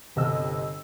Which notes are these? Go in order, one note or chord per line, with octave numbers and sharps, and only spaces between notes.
G1 C3 D#5 E6